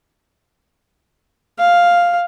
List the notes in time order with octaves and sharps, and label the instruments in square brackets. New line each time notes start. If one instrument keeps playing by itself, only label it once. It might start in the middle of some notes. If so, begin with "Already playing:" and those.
[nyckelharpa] F5